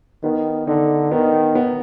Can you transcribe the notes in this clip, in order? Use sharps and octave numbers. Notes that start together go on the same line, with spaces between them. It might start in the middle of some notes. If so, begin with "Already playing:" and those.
D#3 B3
D3 D#4
D#3 B3
B3